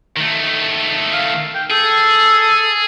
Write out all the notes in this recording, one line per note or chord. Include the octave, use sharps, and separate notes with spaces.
D#3 A3
F5
G5
G#4 A4